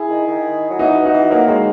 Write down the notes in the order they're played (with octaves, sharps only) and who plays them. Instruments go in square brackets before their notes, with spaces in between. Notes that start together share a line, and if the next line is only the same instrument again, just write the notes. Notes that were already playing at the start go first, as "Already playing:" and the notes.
Already playing: [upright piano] E4 G#4
[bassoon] D#3
D#3
F#3
[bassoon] E3 [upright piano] D#4 F#4
[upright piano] D#4 F#4
[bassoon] E3
[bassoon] F#3 [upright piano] A#3
[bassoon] D#3 [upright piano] G#3